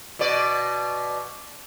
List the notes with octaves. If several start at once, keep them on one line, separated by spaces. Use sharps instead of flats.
B2 D5